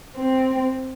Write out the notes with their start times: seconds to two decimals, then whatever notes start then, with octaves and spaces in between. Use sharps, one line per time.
0.17 C4